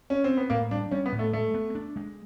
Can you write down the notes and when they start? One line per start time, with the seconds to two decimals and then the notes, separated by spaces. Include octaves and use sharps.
0.10 C#4
0.24 C4
0.37 B3
0.50 A2 A#3
0.71 G3 D4
0.91 G3 C#4
1.06 B3
1.12 A2
1.19 A3
1.33 G#3 A3
1.54 B3
1.75 D4
1.96 G#3